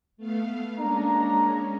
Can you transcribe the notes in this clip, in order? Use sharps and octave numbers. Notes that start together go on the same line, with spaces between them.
A3 B3 F5
G#3 A#3 C#4 D4 A#5